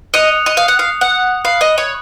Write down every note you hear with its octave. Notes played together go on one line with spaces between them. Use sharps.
D#5 D#6 F#6 C#7 F7
D#5
F5
F#5
F5
F#5
F5 B5 F#6 C#7 F#7
D#5
C#5